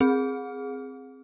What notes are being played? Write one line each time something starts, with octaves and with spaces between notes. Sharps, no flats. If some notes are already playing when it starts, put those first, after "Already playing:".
C4 G#4